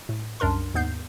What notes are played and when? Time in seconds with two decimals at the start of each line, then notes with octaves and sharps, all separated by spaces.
0.09 A2
0.40 C2 F#2 D4 A#4 C6
0.74 D#2 G#2 B3 G6 C7